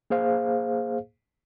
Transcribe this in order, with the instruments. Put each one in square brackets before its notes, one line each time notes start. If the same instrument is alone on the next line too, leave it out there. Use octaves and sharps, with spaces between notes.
[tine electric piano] A#3 G#4 C5 F5